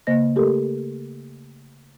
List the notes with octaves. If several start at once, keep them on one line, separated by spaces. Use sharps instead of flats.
C#3 A#3 C5 D#5 A#6
A3 G4 A4 A#4